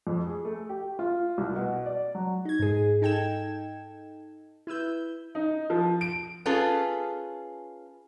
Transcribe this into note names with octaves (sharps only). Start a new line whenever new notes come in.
F2
G#4
A3
G4
F4
C2
B2
D5
F#3
D#4 G#6
G#2 G#4
D#4 A4 G5 G#6 E7
E4 B4 E6 G6
D#4
F3
D7
C#4 F4 G#4 A4 B4